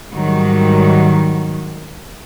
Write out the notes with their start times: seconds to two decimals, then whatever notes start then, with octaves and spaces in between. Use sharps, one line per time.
0.13 G#2 D#3 F#3 G3